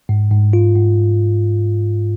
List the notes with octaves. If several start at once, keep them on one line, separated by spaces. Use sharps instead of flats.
G#2
G#2
F4
G#2